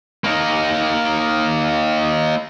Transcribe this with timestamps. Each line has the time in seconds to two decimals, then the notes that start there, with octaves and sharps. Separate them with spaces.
0.24 A#3 D#4